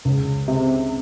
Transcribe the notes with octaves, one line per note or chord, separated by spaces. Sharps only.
C#2
C3